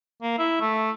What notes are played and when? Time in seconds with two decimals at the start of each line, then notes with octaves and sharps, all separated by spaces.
0.22 A#3
0.39 E4
0.61 A3